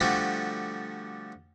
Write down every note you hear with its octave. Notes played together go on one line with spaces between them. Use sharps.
D3 F3 G3 A3 F#4